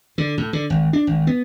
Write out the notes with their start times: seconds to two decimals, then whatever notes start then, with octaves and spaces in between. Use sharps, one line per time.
0.18 D3
0.38 A2
0.53 D3
0.70 G#1
0.93 D4
1.07 G#1
1.27 B3